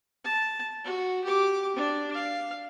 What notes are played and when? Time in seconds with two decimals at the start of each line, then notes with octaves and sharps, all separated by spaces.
0.24 A5
0.84 F#4
1.24 G4 D6
1.76 D4
2.14 F5